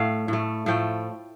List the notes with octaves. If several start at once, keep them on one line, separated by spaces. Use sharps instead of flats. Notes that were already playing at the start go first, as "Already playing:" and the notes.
Already playing: A2 A3 F5
A2 A3
A2 F3 A3 G5